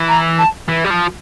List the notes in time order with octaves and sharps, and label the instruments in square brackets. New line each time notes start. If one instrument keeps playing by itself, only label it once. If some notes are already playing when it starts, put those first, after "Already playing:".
Already playing: [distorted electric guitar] E3
[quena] A#5
A5
[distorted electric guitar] E3
G3
F3